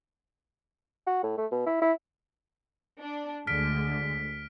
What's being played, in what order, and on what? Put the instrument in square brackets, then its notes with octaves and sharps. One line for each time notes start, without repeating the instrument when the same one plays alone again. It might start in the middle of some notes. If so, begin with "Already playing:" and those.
[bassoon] F#4
A2
A3
B2
E4
E4
[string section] D4
[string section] D2 D3 G#3 [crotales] F6 B6 D7